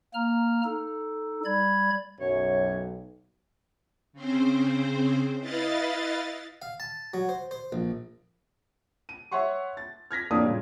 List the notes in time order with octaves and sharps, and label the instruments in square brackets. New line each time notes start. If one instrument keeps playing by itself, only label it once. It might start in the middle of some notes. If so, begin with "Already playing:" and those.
[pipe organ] A#3 A#5 F6
D#4 A4
G3 D5 B5 G#6
[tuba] B1 [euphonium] F#2 [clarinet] C#5
[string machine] C#3 C4 C5
E4 B4 D#5 F5 A6
[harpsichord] F5
A5
F#3
C5
C5
A#1
[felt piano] D#7
C#5 E5 F#5 C6 C#6
A6
F6 G#6 A#6 B6
F2 A2 A#3 D4 D#6
A#2 C#3 G3